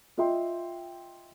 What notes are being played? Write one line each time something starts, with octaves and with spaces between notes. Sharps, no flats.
F4 D#5 E5 G5 C6